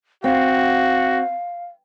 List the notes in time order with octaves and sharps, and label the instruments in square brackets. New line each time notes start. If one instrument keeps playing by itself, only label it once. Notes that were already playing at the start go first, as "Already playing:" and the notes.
[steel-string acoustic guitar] C4 [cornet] F#4 [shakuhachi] F5